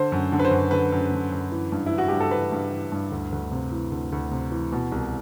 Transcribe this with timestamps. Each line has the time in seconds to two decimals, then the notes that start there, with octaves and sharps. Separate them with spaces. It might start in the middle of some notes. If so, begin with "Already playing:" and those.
Already playing: D3 C5
0.12 F#2
0.32 D3
0.39 B4
0.45 C5
0.51 F#2
0.71 D3 B4
0.92 F#2
1.12 D3
1.32 F#2
1.52 E3
1.72 G2
1.86 E3 E4
1.98 F#4
2.08 G2 G4
2.20 A4
2.31 E3 B4
2.52 G2
2.72 E3
2.92 G2
3.12 D2
3.32 D2
3.52 C3
3.72 E3
3.92 D2
4.12 D2
4.31 C3
4.51 E3
4.72 B2
4.92 C2